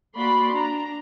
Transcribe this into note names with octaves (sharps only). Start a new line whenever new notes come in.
A#3 F#4 D5 B5 C6
D4 A#5